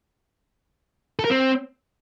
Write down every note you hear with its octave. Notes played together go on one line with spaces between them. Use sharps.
A4
A#4
C4